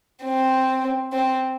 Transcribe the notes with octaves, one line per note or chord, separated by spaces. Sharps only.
C4
C4